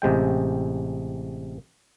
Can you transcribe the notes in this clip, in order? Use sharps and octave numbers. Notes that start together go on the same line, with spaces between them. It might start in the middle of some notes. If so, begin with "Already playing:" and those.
A1 C3 G#3 G5